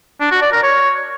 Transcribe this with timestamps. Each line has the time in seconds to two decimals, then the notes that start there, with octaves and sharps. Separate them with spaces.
0.21 D4
0.31 F#4
0.42 D5
0.52 A#4
0.63 C#5